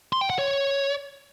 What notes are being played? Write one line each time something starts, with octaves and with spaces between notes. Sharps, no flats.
C6
G5
F#5
C#5